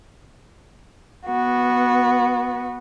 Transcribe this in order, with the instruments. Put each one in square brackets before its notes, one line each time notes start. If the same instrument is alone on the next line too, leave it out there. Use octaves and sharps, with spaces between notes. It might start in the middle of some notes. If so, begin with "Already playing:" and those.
[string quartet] B3 F#4